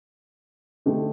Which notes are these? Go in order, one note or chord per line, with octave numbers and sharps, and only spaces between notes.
D3 A3 C4 D#4 G4